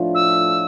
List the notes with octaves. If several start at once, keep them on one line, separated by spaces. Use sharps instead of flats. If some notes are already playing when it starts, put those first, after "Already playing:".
Already playing: A2 F3 A3 D4 F4
E6